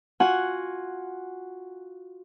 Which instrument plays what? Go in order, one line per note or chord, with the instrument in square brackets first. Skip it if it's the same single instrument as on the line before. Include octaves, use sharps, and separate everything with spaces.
[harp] F4 F#4 F#5 G#5